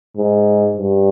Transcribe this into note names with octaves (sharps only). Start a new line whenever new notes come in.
G#2
G2